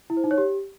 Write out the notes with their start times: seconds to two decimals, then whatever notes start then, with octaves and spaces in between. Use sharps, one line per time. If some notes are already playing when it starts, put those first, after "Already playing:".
0.10 E4
0.17 C5
0.24 D#4
0.31 C#5
0.38 G4